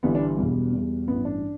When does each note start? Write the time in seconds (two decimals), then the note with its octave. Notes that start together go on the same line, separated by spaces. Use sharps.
0.03 G1 G2 E3 G3 B3
0.15 D4
0.38 E1 E2 B2 G3
0.73 E2 B2 G3
1.08 A1 G2 E3 B3
1.25 D4